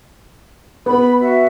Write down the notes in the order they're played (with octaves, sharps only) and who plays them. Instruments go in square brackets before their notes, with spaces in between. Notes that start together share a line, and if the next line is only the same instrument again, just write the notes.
[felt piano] B3 [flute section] B5
[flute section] F#4 E5